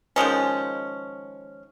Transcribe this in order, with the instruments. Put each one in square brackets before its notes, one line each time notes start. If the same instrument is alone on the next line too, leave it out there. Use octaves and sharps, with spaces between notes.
[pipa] D#3 F3 G#3 C#4